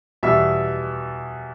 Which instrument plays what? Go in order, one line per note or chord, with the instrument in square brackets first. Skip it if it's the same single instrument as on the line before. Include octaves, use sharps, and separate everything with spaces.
[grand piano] E2 B2 G3 E5